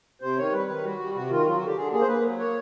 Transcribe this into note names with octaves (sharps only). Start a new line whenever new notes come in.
C3 C5
D#3 C#5
G3 B4
D#3
G3 F#4
G3
C3 F#4
D#3 F4
F#4
F#3 F4
F#4
D3
G4
D3 G#4
A#3 G#4
C5
A#3 B4
F#3
A#3 C#5